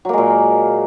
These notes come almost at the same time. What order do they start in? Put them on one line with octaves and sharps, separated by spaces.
F#3 A#3 G#3 A#2